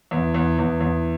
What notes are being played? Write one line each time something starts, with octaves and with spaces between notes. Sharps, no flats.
E2
E2
E2
E2